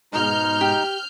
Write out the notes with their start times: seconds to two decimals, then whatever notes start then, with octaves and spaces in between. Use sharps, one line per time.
0.13 G#2 B2 G#3 D#4 F6 G6
0.61 G4